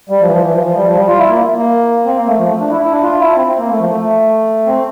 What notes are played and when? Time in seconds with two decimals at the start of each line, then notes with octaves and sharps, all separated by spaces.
0.09 G3
0.20 F3
0.27 E3
0.31 F3
0.42 E3
0.53 F3
0.64 F3
0.75 G3
0.86 F3
0.97 G3
1.08 F4
1.18 E4
1.29 A#3
1.56 A#3
2.05 C4
2.17 A#3
2.27 A3
2.38 F3
2.49 A3
2.60 D4
2.71 E4
2.81 E4
2.92 D4
3.03 F4
3.19 E4
3.36 C4
3.47 C4
3.58 A#3
3.69 A3
3.80 F3
3.90 A3
4.66 C4